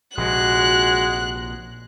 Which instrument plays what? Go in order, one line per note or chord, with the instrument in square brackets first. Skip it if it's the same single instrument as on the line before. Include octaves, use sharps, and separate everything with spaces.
[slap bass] A#1 C3 [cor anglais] G#3 [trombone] F#4 [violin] F#6